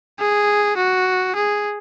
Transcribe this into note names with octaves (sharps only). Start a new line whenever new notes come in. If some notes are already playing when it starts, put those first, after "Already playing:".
G#4
F#4
G#4